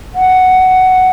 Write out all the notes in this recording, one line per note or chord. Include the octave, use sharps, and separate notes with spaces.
F#5